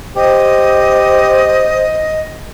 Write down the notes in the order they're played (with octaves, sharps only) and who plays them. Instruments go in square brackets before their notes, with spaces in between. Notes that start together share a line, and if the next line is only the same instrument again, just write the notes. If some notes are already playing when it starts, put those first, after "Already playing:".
[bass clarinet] G4 [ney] C5 [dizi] D#5